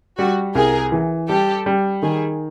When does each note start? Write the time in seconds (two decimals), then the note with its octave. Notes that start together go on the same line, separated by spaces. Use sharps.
0.18 G3 F#4
0.55 C2 G#4 A#4
0.92 E3
1.29 G3 G4 A4
1.66 G3
2.02 D#3 G#4